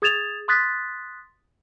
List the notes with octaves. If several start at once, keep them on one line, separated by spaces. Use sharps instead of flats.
G#4 D#6 G#6 A6 E7 F7
C6 D#6 F#6 A6 B6